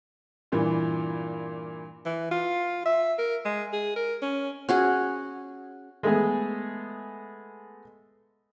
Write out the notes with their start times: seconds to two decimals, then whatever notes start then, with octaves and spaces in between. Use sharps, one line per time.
0.52 G2 A#2 E3
2.06 E3
2.31 F4
2.85 E5
3.19 A#4
3.45 G#3
3.73 G#4
3.96 A#4
4.22 C#4
4.69 C#4 F#4 G#4
6.03 G#3 A3 B3 G#4